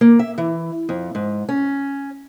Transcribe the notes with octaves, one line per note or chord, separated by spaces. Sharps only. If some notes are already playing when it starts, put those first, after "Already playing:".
A#3
E5
E3
F2
G#2
C#4